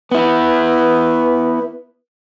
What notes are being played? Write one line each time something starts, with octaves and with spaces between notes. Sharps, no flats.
B3 E4 B4